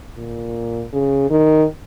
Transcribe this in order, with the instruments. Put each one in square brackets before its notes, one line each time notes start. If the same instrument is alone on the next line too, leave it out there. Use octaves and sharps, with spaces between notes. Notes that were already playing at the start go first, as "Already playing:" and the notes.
[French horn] A#2
C#3
D#3